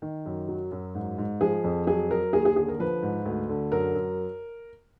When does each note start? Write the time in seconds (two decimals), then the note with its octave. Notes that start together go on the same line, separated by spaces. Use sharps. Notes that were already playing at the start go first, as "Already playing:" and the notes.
0.02 D#3
0.26 F#2
0.48 F#3
0.72 F#2
0.95 G#2
1.18 G#2
1.41 F3 G#4
1.64 F2
1.87 F#3 G#4
2.10 F#3 A#4
2.33 D#2 G#4
2.45 G#4
2.56 D3 G#4
2.68 A#4
2.80 F3 B4
3.02 G#2
3.25 D2
3.49 D3
3.72 F#2 A#4
3.95 F#2